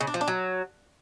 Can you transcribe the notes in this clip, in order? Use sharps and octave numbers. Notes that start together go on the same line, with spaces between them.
C#3
D4
F3
D4
F#3